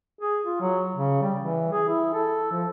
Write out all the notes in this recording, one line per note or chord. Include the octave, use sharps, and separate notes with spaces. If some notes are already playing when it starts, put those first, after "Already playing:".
G#4
F4
F#3
C#3
G3
E3
G#4
E4
A4
F3